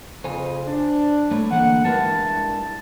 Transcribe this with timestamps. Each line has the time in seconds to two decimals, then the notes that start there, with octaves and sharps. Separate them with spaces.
0.24 F2 C#3 C5 G#5
0.67 D4
1.31 A3 C#5
1.51 D3 E3 A#3 F#5
1.85 G2 G#3 E4 A#4 A5